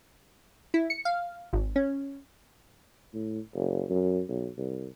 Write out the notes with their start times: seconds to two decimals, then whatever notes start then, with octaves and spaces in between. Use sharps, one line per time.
0.74 E4
0.90 C#7
1.05 F5
1.53 G#1
1.76 C#4
3.14 A2
3.55 F#1
3.90 F#2
4.28 B1
4.57 C2